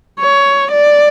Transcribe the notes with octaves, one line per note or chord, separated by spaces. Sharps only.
C#5
D5